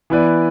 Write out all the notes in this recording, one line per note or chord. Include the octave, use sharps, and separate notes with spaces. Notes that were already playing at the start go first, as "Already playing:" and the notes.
E3 B3 E4 B4 D5